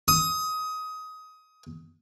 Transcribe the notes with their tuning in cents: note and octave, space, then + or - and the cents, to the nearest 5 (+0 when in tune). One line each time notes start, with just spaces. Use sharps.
D#6 +20